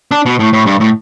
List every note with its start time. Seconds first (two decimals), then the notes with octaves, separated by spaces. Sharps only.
0.11 D4
0.26 B2
0.39 A2
0.53 A2
0.66 G2
0.80 A2